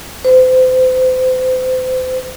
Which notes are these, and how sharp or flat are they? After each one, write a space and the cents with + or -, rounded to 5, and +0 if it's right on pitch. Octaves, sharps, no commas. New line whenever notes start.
C5 -35